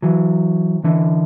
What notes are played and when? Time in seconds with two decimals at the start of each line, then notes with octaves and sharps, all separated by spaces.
0.02 E3 F#3
0.84 D3 E3